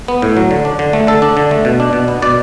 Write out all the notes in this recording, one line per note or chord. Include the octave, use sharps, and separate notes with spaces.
B3
A2
F#3
D3
D4
D3
A3
D3 A4
D4
D3
A3
B2
D4
B2
B3
B2 D5